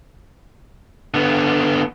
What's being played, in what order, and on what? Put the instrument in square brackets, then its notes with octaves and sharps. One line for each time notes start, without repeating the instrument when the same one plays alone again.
[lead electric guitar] D3 B3